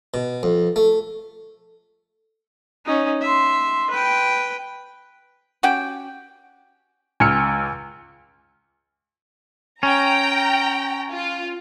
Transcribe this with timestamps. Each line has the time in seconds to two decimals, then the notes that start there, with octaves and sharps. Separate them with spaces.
0.14 B2
0.43 F2
0.76 A3
2.86 C#4 D#4
3.22 E5 C6
3.90 B4 G5
5.63 C#4 F#4 G4 G5
7.20 C#2 G#5 E6 F6 C#7
9.83 C#4 G5 A#5
11.13 F4